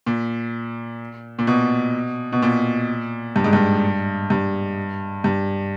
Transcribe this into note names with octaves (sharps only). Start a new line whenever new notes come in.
A#2
A#2
B2
B2
A#2
G2
G#2
G2
G2
G2